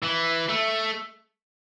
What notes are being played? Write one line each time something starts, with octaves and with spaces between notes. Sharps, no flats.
E3
A3